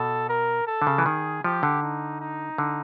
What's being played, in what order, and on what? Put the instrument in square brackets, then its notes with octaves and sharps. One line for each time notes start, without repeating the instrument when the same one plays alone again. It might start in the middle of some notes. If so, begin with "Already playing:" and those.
Already playing: [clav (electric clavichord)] B2 [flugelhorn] A4
[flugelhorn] A#4
A4
[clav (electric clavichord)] D3
C#3
E3
[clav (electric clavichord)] D#3 [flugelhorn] G#4
[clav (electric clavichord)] F3 [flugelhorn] G4
[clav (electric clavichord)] D3
[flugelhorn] D#4
D#4
[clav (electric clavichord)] D3